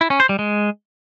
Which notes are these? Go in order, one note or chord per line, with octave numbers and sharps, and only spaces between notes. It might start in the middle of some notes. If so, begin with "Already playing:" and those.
E4
C#4
C5
G3
G#3